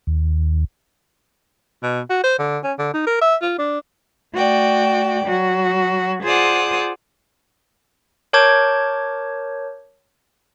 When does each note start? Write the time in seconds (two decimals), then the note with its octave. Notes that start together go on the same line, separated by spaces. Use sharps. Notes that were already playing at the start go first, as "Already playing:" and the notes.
0.07 D#2
1.83 B2
2.10 F#4
2.24 C5
2.39 D3
2.64 C#4
2.79 D3
2.94 D#4
3.07 A#4
3.21 E5
3.42 F4
3.58 D4
4.36 A3 F#4 D5 G5
5.26 F#3 F#4
6.24 F4 G#4 C5 D5 F#5 D#6
8.33 A#4 C#5 A5 D6 G6 G#6